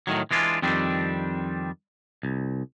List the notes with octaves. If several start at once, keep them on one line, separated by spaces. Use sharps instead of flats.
A2 D#3 F#3
E3 G#3 D4 F4
F2 D#3 G3 C4 D4
C2